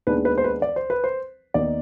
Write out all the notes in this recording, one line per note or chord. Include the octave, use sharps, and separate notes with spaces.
D#2 D#3 G#3 B3 D4 B4
B4
C5
B4
D5
C5
B4
C5
D#2 D#3 B3 D#4 D5